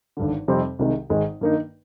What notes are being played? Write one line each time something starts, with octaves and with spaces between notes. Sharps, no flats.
G#1 G2 D3
F2 C3 G3 C4 D#4
C2 C3 D#3 G#3
G#1 G#2 D#3 G#3
G2 D#3 A#3 D#4